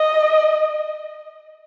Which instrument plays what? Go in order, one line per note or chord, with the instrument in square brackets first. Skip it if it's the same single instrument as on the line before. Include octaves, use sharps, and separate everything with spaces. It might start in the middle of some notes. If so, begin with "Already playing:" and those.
Already playing: [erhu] D#5